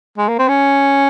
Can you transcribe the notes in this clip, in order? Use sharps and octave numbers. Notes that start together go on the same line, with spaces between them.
G#3
A#3
C4
C#4